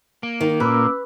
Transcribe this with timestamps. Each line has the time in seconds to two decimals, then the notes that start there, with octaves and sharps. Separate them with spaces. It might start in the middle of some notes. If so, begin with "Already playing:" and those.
0.23 A#3
0.41 D#3
0.60 A#2 C#4 B4 D6 E6